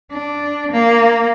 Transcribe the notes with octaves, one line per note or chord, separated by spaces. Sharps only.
D4
A#3